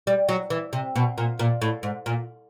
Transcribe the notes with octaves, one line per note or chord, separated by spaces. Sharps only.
G3
F#3
E3
C3
B2
A#2
A#2
A2
G#2
A#2